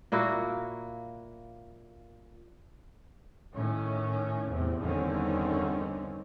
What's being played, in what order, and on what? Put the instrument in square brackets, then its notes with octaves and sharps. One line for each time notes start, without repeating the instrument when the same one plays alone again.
[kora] A#2 A#3 E4 F#4
[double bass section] A2 D#3 C#4
E2 A2 C3
E2 G2 D3 D#3 C4 C#4